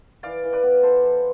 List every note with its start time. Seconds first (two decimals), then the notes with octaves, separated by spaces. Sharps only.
0.23 E3 D5 F5
0.44 E3
0.53 B4 D5
0.63 B3
0.83 E3 A4 C5
1.03 E3